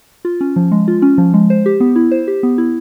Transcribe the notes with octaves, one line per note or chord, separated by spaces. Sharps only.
F4
C#4
F3
G#3
F4
C#4
F3
G#3
C5
G4
B3
E4
C5
G4
B3
E4